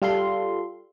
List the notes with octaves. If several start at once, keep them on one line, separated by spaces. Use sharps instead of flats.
G3 F4 A4 C6